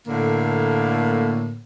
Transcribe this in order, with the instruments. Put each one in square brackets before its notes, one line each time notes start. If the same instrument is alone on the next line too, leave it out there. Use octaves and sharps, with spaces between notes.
[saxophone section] A2 D3 A#3